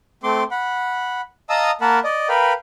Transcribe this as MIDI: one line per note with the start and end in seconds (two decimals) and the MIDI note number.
0.24 0.43 57
0.24 0.43 60
0.24 0.43 84
0.24 0.43 86
0.51 1.21 78
0.51 1.21 83
1.50 1.71 75
1.50 1.71 77
1.50 1.71 81
1.50 1.71 82
1.50 1.71 87
1.50 1.71 88
1.81 1.99 58
1.81 1.99 70
1.81 1.99 78
1.81 1.99 81
1.81 1.99 83
2.04 2.28 74
2.04 2.28 75
2.29 2.53 70
2.29 2.53 71
2.29 2.53 77
2.29 2.53 79
2.29 2.53 83